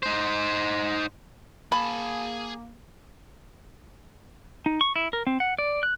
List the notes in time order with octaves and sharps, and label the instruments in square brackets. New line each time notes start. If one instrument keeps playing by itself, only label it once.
[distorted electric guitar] D#4 C5
[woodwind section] A#3 [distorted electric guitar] G#4 A5 [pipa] B5
[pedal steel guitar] D#4
C#6
E4
A#4
C4
F#5
D5
F#6